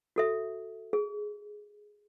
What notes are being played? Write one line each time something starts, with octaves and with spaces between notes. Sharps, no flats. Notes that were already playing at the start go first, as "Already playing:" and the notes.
F#4 A4 E5
G#4